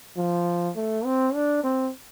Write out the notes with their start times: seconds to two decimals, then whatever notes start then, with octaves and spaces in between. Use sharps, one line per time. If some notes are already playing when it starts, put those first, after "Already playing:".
0.17 F3
0.76 A3
1.05 C4
1.35 D4
1.64 C4